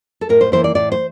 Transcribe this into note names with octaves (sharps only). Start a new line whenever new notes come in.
A4
A2 A#4
C5
E3 A#3 E4 C5
D5
A2 D5
C5